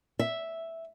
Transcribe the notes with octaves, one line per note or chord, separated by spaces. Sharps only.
E5